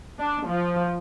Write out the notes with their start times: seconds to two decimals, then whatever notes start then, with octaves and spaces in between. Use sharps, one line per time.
0.19 D4
0.49 F3